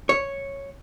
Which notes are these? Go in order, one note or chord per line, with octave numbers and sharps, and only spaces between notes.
C#5